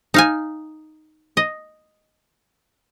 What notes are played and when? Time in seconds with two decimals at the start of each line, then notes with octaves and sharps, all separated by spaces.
0.14 D#4 F5 G#5
1.37 D#5